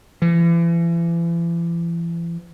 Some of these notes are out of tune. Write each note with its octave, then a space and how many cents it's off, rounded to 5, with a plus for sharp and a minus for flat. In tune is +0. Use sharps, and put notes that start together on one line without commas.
E3 +40